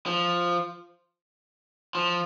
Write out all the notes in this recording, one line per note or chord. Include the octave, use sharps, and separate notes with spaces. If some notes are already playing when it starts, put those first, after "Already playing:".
F3
F3